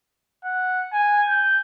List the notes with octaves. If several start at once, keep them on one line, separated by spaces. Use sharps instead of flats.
F#5
G#5
G6